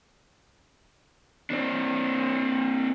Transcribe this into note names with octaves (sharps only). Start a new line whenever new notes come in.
C4 D4